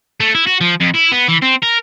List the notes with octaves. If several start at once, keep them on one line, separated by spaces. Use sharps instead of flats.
A3
E4
F#4
F3
F2
E4
B3
E3
C4
A#4